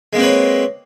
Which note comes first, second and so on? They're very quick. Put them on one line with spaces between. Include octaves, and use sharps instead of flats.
G#3 A#3 C4 B4 C#5